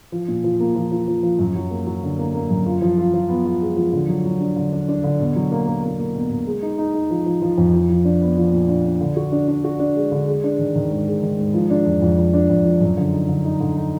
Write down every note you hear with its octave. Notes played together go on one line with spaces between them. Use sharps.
F3
A#2
F3
A#3
F3
F3
F3
F3
F#2
F#3
A#3
F#3
D3
A#3
A#3
F#2
F4
F3
F4
F3
B3
F4
G#3
F3
D3
F#3
F#3
D4
D3
D4
D4
D3
B2
F#3
A#3
A#3
A#3
A#3
B2
B2
G#3
D#4
D#4
D#4
F3
F3
F3
F2
F3
F3
D4
B3
F3
A#2
D4
D4
D3
F#4
D4
D4
F#4
D4
G#3
D3
G#3
D4
D#3
D#3
G#2
G#3
D#3
G#2
F3
D4
F2
F2
F2
D4
F2
F3
F#2
D3
D#4
D3
D#4
D3
D#4